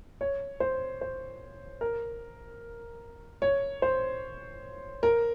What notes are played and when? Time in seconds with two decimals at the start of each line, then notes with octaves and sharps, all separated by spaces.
0.21 C#5
0.60 C5
1.01 C5
1.81 A#4
3.42 C#5
3.82 C5
5.03 A#4